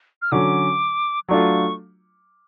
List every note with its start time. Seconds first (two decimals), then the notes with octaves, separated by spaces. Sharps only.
0.22 F6
0.32 D3 F#3 C#4 D6
1.29 F#3 A3 D4 F4 C#6